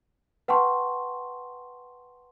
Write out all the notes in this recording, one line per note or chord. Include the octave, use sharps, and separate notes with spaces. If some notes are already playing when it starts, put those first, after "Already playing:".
B4 F#5 G5 A5 C6 C#6